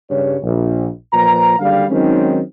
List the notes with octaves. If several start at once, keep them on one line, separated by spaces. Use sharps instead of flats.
G2 C#3 G3 C#5
A#1
A#2 F3 B4 A#5
F#1 D3 G3 F5
D#3 F#3 G#3 C4 C#4 D#4